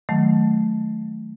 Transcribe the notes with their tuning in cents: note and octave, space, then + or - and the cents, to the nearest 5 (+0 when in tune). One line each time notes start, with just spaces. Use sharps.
D#3 +5 F#3 +0 A3 -15